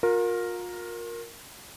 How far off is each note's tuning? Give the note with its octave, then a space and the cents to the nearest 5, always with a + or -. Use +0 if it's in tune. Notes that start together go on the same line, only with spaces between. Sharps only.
F4 +40 A#4 +0